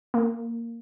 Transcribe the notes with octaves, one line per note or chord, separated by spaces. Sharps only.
A#3